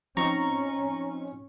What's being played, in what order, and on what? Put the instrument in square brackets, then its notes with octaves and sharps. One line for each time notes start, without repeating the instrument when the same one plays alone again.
[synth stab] F3 C4 D#4 [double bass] C#4 [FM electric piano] A#5 [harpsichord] C#6